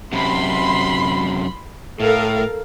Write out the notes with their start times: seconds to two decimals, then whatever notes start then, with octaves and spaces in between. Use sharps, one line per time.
0.13 F#2 C3 B5 C6
2.00 A2 A4 A#4 F5